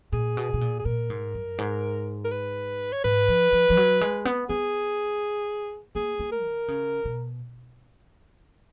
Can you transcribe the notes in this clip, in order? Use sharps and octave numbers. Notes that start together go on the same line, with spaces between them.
A#2 G#4
B2
B2
A#2
G#4
A#2 A#4
G#2
F#2
G#2
A#4
B4
C#5
G#2 B4
F3
F3
F3
F#3
G#3
B3
B3 G#4
A#3 G#4
A#3
A#4
D#3
C#3
B2